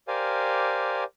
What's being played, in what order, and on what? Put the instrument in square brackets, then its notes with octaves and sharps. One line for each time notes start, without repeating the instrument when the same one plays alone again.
[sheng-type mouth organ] G4 A#4 C5 D5 F5 G#5